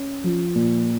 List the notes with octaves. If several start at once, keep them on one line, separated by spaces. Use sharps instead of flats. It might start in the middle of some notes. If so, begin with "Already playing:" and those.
Already playing: C#4
F3
A#2